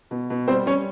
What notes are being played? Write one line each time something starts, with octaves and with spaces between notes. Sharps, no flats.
B2
B2
G3 C4 C5
G3 C#4 C#5